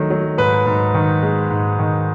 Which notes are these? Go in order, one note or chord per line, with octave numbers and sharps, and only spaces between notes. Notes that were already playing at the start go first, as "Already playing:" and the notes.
Already playing: D#3 F#3 A3
F#3
G#2 B4
G#2
D#3
G#3
G#2
D#3